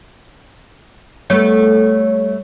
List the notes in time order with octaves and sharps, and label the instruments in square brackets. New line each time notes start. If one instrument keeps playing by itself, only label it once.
[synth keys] G3 C#5 [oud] A3 B3